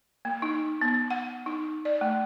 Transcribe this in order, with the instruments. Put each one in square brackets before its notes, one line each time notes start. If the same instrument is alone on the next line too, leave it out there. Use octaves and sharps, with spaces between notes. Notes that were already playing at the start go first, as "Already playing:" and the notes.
[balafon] A#3
D#4
B3
F#5
D#4
D5
A3